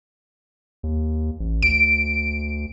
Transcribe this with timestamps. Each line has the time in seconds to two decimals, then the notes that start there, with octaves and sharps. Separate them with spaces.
0.83 D#2
1.40 A1
1.62 D2 D7